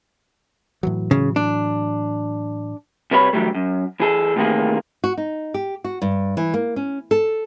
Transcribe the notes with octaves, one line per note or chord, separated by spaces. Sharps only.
A2 E3 F#3
C#3
D4
C3 G3 B4 C#5 D#5 B5
D3 E3 F#3 G3 A3
F#2
E3 G#4 A4
A2 C3 D#3 E3 A#3 G#4
F#4
D#4
G4
F#4
G2
E3
A#3
C#4
A4